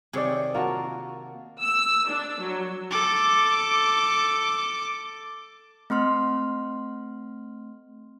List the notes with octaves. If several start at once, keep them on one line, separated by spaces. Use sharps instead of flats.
C3 D#3 G#4 C#5 D5
A#3 F4 F#4 A5
E6
D4
F#3
A4 D6
A3 C4 C6 F6